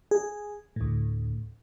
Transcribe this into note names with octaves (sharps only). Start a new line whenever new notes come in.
G#4
D2 A2